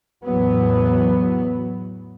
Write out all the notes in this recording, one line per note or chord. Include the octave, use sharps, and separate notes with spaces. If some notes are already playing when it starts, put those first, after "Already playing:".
E2 A2 E3 F#3 B3